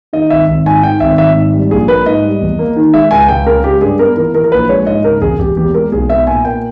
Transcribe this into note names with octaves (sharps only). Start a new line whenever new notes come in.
D#3 D#5
G#1 E5
G#1
G#2 G#5
D#3 G5
G#1 E5
G#1 E5
G#2
G3
A#1 G#4
A#3 B4
G#2 D#5
G3
E2
A#3
D#3
G#3 E5
C#2 G#5
C#2 G5
C#3 A#4
G#3 G4
G2 G#4
B3 A#4
E3 A#4
E3 A#4
A#4
A#1 B4
G#3 C#5
G#2 D#5
C#3 A#4
E1 G#4
E1 G4
E2 G4
G#3 A#4
B1 G#4
B3 E5
A#2 G#5
A#3 G5